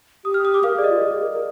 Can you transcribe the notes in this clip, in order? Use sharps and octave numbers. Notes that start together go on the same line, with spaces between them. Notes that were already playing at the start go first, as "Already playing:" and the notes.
G4 D#6
F6
D#6
D6
A#4 F5
G#4 D5
D#5
F4
G4
G#4
A#4
A#4